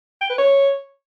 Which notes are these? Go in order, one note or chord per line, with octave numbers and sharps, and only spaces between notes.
G5
B4
C#5